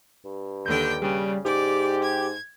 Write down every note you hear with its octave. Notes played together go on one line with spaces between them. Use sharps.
G2
D#2 D3 G5 G6
C#3 G3
G#2 G4 D5
G#6